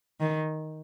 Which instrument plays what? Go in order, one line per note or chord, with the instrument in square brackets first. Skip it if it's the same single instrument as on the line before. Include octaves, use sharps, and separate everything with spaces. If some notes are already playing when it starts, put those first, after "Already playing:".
[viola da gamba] D#3